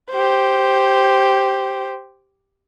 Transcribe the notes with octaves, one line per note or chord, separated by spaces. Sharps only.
G4 C5